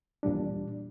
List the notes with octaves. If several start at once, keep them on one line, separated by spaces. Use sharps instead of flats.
E2 A#2 G3 D4